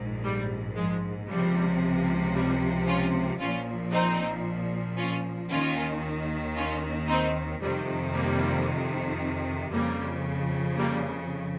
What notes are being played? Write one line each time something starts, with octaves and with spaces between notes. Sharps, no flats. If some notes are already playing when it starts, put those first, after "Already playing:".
Already playing: A#1 G#2
G3
F3 G#3
C#2 C3 F3 G3
G3
C#4 F4
A#1 A#2 F3 C#4 F4
C4 D#4
C#4 F4
D#2 D#3 C#4 F4
C#4 F4
C4 D#4
F2 C3 D#3 G3
G3 A#3
F2 C#3 F3 G3 A#3
G3 A#3